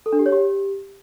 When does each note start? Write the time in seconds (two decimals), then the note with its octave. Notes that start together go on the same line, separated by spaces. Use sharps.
0.06 A4
0.13 D4
0.19 G4
0.26 C#5
0.32 G4